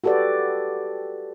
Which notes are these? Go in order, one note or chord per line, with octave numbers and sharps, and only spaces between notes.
F#4 G4 A4 B4 D5